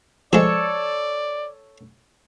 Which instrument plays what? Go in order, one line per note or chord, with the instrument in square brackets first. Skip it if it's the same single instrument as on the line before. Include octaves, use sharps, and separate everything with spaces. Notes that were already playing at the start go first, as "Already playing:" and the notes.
[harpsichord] F3 G#3 [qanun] A4 C#5 [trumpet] D5